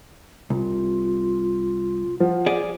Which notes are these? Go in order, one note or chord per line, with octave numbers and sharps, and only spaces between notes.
C2 F4
F3 F#5
G#4 D5